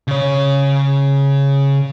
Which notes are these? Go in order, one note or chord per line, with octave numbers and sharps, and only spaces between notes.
C#3 C#5